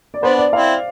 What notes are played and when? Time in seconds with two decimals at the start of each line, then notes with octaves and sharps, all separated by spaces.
0.14 D5
0.23 B3 D4 C5
0.38 D5
0.53 C4 E4 F5